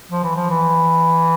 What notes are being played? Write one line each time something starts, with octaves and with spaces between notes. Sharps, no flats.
F3
E3
F3
E3